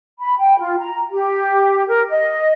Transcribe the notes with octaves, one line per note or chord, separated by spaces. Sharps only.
B5
G5
F4
A#5
G4
A#4
D#5